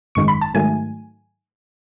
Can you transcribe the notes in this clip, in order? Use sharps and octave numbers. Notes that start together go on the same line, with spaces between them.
G#1 F#2 D#3 G#3 C#6
B5
A5
G#2 D#3 F#3 A3 G#5